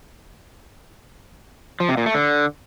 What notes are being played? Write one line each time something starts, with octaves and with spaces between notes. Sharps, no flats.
F3
C3
A#2
A3
D3